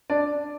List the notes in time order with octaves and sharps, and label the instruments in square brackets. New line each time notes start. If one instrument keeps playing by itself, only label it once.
[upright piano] D4 D5